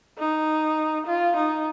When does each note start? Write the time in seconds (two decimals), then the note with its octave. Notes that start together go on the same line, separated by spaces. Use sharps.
0.18 D#4
1.06 F4
1.36 D#4